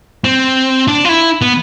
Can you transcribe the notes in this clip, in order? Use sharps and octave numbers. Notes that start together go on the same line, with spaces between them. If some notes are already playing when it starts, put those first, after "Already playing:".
C4
D4
F4
E4
B3